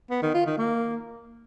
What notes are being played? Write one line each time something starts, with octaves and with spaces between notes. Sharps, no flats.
B3
D#3
F4
D#3
A#3